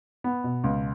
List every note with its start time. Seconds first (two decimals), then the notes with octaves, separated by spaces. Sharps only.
0.24 B3
0.44 B2
0.64 C#2